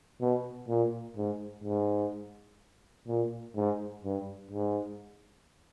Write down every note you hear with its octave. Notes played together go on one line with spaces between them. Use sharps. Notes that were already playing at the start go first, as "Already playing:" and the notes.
B2
A#2
G#2
G#2
A#2
G#2
G2
G#2